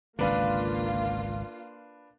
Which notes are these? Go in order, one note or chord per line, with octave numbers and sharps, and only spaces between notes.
G#1 C#2 D3 A#3 D4 F4 B4 F5